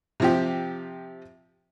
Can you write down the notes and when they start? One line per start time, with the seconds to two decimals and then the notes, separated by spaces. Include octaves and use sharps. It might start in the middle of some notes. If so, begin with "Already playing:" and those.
0.20 C3 F3 G4